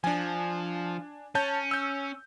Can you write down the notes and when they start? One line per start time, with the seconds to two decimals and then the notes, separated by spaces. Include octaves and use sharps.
0.04 F3 D4 G#5
1.35 C#4 C#5 A5 G6
1.71 E6 G6